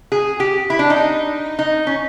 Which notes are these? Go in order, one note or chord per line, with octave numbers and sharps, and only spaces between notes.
G#4
G4
E4
D4
D#4
D#4
C#4